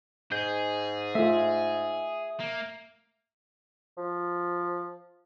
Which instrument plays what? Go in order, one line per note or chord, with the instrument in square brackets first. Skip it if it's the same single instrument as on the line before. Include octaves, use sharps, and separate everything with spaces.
[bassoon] G#2 [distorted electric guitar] G#4 [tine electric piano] G6
[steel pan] A3 F4 [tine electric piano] E5
[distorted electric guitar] A#3
[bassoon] F3